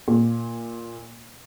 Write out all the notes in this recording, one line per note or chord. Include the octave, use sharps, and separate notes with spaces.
A#2